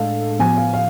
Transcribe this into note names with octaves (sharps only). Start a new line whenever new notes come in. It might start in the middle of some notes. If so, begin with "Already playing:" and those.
Already playing: A2 G#3 D4 A4 F5
A2 F3 B3 G#5
F5
F5